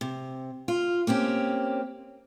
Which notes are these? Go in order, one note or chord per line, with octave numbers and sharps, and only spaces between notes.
C3
F4
A#3 C4 C#4 G4